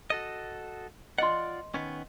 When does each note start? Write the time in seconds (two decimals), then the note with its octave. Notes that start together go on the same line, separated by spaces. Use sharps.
0.10 F#4 A4 D#5
1.18 F4 D5 D#5 F#5 C6
1.74 D#3 B3 C#4